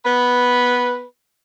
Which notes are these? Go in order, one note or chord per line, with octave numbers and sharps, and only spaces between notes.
B3 B4